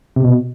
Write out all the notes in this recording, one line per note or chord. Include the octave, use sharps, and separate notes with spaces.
C3
B2